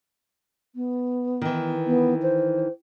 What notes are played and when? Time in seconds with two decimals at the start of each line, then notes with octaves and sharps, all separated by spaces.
0.75 B3
1.42 D#3 E3
1.87 B3
2.22 C5